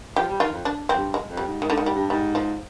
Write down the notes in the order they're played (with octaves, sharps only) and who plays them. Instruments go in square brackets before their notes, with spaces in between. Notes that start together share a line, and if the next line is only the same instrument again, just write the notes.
[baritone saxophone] F3 [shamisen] G4
[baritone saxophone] G3
[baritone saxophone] D#3 [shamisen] F4
[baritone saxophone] F2
[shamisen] D4
[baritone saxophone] F2 [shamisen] C4
[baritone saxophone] G2
[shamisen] G#3
[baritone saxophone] F2
[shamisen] G3
[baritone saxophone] G#2
[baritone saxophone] G#2 [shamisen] D#3
[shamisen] D3
[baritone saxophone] G#2 [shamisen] D#3
[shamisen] G3
[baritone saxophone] G2
[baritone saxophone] G#2 [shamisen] G3
[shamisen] F3